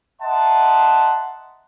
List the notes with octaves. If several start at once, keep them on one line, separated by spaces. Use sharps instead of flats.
D#5 E5 F#5 A5 A#5 C6